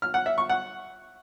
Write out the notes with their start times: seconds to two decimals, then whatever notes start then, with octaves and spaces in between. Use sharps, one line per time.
0.02 F6
0.14 F#5
0.26 E5
0.38 C#6
0.49 F#5